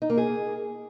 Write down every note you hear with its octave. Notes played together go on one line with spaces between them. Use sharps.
D#4
A#3
G#4